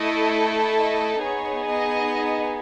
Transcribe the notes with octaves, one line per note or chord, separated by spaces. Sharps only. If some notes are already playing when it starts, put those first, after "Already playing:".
Already playing: A3 E4 A4 D#5
D#5
B3 D#4 G#4 C#5
D#5